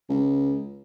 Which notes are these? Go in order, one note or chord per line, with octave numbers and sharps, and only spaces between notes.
C#2